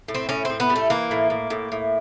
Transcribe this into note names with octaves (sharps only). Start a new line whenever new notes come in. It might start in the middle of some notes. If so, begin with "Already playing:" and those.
A2
C4
A2 C#4
A2 C4
B3
G3
A3
E3 A#3
A2
A2
A2
A2